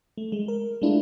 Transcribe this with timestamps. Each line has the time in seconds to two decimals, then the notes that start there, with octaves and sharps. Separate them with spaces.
0.18 A3
0.32 G#3
0.48 A#4
0.82 G#3 A3 D4 E4 F4